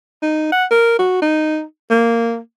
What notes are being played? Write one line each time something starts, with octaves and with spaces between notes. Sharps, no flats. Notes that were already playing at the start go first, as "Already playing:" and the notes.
D#4
F#5
A#4
F#4
D#4
A#3